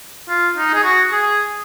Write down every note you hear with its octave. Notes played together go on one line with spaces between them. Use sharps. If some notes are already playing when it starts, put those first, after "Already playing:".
F4
D#4
G#4
F#4
G#4